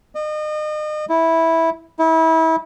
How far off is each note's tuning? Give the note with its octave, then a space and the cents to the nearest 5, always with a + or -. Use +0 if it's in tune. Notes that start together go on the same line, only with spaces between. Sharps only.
D#5 -35
E4 -10
E4 -30